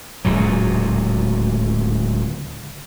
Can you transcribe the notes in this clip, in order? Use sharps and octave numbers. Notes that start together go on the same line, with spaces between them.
D1 C#2 A#2 F#3